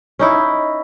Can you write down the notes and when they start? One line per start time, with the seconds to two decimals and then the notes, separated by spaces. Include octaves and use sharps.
0.19 C#4 D#4 E4